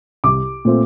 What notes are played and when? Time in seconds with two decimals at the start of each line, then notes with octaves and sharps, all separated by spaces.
0.24 C2 D6
0.65 A#2 A3 C4